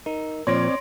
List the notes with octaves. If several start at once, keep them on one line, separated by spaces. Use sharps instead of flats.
D#4 A#4
A#2 F3 C4 C#5 D5 C6 A#6 D7